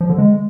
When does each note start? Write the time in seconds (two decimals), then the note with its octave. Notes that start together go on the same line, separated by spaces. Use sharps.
0.01 F3
0.09 D3
0.18 G#3